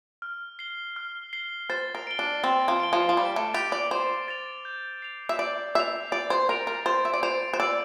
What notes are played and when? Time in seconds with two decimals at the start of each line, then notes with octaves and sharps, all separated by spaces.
0.22 F6
0.59 C7 G7
0.96 F6
1.33 C7 G7
1.70 C5 A6
1.95 A#4
2.07 D7 G7
2.19 D4
2.44 C4 A6
2.68 F3
2.80 D7 G7
2.93 F3
3.09 F3
3.17 G3 D6
3.36 A3
3.54 G4 A6 D7 F7
3.72 D5
3.91 C5 D6
4.28 A6 D7 F7
4.65 G6
5.02 C7 F7
5.29 E5
5.39 D5 G6
5.75 E5 C7 F7
6.12 D5 A6
6.30 C5
6.49 A#4 D7 F7
6.67 A#4
6.86 C5 A6
7.05 E5
7.14 D5
7.23 C5 D7 F7
7.54 C5
7.60 D5 E6